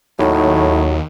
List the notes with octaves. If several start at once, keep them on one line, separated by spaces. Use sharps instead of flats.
D#2 A2 F#3 D#4